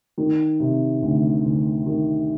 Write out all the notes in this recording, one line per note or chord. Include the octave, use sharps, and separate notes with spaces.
D#3
C3
D2
D2
D#3